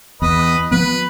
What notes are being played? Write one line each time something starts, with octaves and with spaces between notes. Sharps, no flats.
E2 B4 D#5 B5
F3 B3 B4